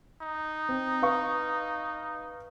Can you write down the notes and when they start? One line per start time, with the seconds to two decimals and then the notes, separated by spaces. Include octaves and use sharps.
0.22 D#4
0.69 C4
1.02 B4 F5 C#6